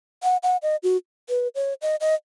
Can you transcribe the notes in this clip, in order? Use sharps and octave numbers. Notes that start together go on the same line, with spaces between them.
F#5
F#5
D#5
F#4
B4
C#5
D#5
D#5